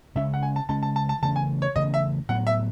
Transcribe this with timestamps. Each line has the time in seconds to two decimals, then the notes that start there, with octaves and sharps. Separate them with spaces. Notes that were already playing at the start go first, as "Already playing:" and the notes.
0.16 C#3 G#3 C#4 E5
0.34 F#5
0.43 G#5
0.56 A5
0.69 C#3 G#3 C#4 A5
0.83 A5
0.96 A5
1.09 A5
1.22 C#3 E3 A3 C#4 A5
1.36 G#5
1.62 C#5
1.76 C#3 E3 A3 C#4 D#5
1.94 E5
2.29 A2 F#3 B3 F#5
2.47 E5